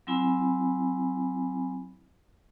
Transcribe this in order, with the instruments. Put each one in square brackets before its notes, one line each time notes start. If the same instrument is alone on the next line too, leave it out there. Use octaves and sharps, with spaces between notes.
[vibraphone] F#3 C4 E4 G#5 B5